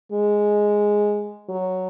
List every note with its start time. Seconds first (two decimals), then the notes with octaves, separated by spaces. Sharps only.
0.12 G#3
1.50 F#3